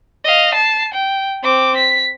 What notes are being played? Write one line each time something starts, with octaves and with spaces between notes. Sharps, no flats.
D#5 F5
A5 C7
G5
C4 D6
B6